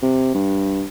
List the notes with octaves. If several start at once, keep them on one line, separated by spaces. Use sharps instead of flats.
C3
G2